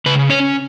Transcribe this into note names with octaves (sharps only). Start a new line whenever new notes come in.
C#3 B4
C#4 C#5